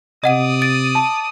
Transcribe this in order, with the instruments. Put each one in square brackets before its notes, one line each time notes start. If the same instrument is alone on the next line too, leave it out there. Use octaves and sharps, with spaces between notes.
[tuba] C3 [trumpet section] D5 D#6 [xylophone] D#5 F#5 D#7
[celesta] A6 [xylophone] D7
[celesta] A5